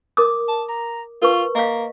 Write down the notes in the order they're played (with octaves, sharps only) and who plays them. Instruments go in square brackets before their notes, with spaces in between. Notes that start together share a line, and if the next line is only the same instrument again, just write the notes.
[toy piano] A#4 D6 D#6
[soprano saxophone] A5
A#5
[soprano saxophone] F4 [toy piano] A#4 B4 C#6
[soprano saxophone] A#3 [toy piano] D#5 F5